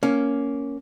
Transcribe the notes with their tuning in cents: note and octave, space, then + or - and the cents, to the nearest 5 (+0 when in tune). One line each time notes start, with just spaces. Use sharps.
A#3 +0 C#4 +5